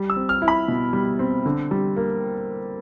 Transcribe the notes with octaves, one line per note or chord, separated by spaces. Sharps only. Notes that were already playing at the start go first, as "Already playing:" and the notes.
Already playing: G3
E6
C4
F6
E4
B5
B2
G3
C4
D3
G3
A#3